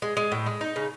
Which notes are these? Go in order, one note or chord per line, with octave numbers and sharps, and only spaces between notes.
G#3
G#3
A2
G#3
D#4
C#3